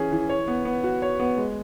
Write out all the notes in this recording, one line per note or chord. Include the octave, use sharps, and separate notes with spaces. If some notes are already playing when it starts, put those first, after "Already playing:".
Already playing: E3 C#4 G#4
E3
C#5
B3
B3
F#4
C#5
B3
G#3